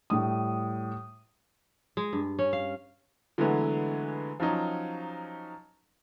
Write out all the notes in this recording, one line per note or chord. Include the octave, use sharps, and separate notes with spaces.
A2 G3 D#6
G#3
G2
C#4
F5
D3 E3 F#3 G#3 A3 B3
F3 F#3 C#4 D#4